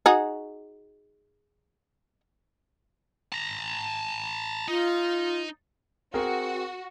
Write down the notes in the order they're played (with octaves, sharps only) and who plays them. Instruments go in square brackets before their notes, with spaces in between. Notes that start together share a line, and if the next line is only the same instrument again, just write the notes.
[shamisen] D#4 F#4 G#4
[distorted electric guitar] A5 A#5
[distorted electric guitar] D#4 [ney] F4
[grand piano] C4 G#4 A#4 [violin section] F#4